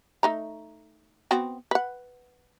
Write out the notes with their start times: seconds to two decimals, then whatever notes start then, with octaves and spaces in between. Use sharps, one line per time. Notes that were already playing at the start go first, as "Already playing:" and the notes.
0.23 A3 D#4 A#5
1.31 B3 C4 F#4
1.71 B4 F#5